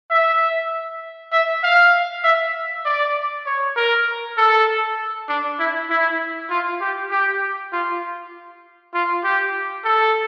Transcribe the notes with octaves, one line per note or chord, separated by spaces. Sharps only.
E5
E5
F5
E5
D5
C#5
A#4
A4
D4
E4
E4
F4
G4
G4
F4
F4
G4
A4